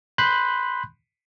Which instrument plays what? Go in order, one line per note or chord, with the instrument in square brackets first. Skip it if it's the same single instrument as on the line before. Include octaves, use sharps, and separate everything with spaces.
[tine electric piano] B5 C6 F#6 G6